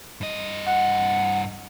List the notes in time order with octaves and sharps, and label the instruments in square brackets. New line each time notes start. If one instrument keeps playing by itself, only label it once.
[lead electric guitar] G2 D#5
[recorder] F#5